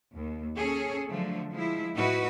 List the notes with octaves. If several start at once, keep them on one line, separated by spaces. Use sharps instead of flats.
D#2
C#4 G#4 A4 C#5
D3 F3 F#3 A3
F3 G#3 E4
A2 D#4 E4 F#4 B4